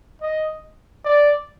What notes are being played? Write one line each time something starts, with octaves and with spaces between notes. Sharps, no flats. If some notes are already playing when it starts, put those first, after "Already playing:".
D#5
D5